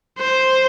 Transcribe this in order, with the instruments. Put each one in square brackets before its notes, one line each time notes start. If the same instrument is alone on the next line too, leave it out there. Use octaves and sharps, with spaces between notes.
[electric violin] C5